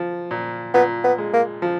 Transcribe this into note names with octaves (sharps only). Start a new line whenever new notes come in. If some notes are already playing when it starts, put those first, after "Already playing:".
Already playing: F3
A#2
A#2 B3
B3
G#3
A#3
F3